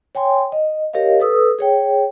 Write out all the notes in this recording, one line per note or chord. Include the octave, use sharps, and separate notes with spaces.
C#5 G5 G#5 C6
D#5
G4 A#4 C#5 D#5 F5
A4 B4 D#6 E6
G#4 C#5 G5